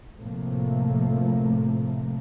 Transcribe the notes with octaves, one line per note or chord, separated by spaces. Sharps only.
A2 C3 F3 A3 A#3